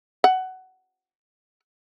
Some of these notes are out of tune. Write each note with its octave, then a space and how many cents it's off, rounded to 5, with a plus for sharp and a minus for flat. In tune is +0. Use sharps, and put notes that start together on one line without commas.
F#5 +15